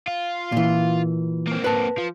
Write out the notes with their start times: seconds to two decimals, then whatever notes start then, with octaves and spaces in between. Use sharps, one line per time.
0.07 F4
0.52 A#2 E3
1.48 A#3 C4
1.64 B4 A5
1.98 F3